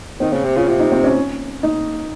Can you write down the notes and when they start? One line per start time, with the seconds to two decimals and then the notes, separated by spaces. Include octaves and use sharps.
0.20 D#3 C4
0.32 C#3 C4
0.44 C3
0.56 C#3 F4
0.68 C3 F4
0.80 D#4
0.92 C4
1.04 C#4
1.63 D#4